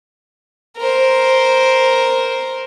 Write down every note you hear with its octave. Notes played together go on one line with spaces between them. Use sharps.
A#4 C5